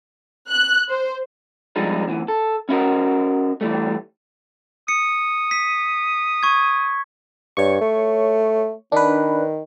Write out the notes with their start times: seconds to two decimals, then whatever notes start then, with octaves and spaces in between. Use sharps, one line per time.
0.50 F#6
0.89 C5
1.76 F3 G3 G#3 D4 D#4
2.08 D2 E3
2.28 A4
2.69 C#4 E4 F#4 A#4 D#5
3.61 E3 G3 A3
4.88 D#6 C#7
5.51 B6
6.43 C#6 G#6
7.57 G2 C#5 C#6
7.81 A3
8.92 D#3 D4 B4